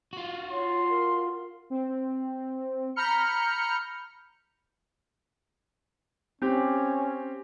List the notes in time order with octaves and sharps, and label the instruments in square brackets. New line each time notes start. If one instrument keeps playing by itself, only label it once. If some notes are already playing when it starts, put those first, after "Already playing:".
[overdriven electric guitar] F4 F#4
[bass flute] C#5 [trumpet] C6
[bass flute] A#4
[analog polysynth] C4
A#5 B5 F6 G6 C#7
[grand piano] C4 G4 [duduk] C#4